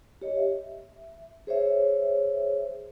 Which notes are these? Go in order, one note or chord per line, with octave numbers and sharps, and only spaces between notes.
G4 C#5 D#5
E5
G#4 C5 C#5 E5